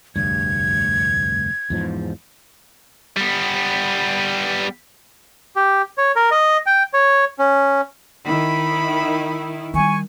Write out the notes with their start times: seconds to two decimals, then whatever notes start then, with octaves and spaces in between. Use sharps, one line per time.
0.16 F1 D2 G2 G#6
1.70 E2 G#2 F3
3.16 G3 B3
5.56 G4
5.98 C#5
6.16 A#4
6.31 D#5
6.66 G5
6.93 C#5
7.39 C#4
8.26 D#3 E4 B5
9.74 D#3 G3 G#5 C#6